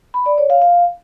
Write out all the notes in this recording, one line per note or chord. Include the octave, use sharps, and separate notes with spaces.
B5
D5
C#5
F5
F5